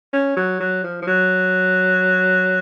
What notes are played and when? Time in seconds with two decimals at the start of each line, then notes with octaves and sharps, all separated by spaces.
0.13 C#4
0.36 F#3
0.60 F#3
0.84 F3
1.02 F3
1.07 F#3